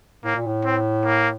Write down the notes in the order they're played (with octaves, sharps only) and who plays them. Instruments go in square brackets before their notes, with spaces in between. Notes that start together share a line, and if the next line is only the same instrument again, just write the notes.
[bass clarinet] A2 [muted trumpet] A#3
[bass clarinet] A#2
A2
[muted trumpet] C4
A#3